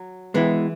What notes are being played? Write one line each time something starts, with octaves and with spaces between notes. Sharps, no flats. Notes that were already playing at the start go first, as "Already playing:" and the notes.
Already playing: F#3
E3 G#3 B3 E4